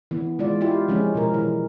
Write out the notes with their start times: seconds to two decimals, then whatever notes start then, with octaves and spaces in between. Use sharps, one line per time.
0.11 E3 B3
0.39 E3 G#3 F4 D5
0.61 E4 F4 G4
0.88 F3 G#3 C#4
1.15 B2 F#3 A#4
1.34 E3